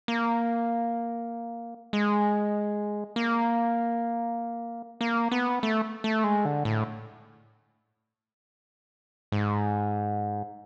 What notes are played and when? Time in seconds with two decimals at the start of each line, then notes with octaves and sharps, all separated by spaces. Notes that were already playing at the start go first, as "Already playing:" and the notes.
0.08 A#3
1.93 G#3
3.16 A#3
5.01 A#3
5.31 B3
5.63 A3
6.04 A3
6.24 G#3
6.45 D3
6.65 A2
9.32 G#2